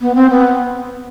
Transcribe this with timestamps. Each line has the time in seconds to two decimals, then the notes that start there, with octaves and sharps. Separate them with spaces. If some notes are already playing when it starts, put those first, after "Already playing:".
0.01 B3
0.15 C4
0.30 B3